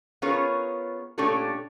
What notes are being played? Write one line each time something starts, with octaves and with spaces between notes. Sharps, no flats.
B3 C#4 F4 G#4 A#4 C#5
A#2 A3 C#4 D4 G4 A4